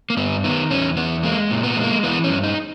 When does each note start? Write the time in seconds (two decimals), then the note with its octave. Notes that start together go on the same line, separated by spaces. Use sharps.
0.10 A#3
0.17 G2 B3
0.44 D#3 B3
0.70 E2 C#4
0.97 E2 B3
1.23 G#3 A#3
1.51 A#2
1.64 B3
1.76 G#3
1.83 A#3
2.03 E3 B3
2.24 C#4
2.30 G2
2.44 D#4